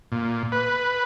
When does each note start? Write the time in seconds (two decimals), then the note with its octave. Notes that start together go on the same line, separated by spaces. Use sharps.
0.12 A#2
0.52 B4